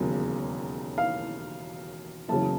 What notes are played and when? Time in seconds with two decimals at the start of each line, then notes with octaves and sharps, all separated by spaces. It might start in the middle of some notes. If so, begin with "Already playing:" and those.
Already playing: E1 D#2 C#3 F#3
0.98 F5
2.29 F#1 E2 C#3 F#3 A5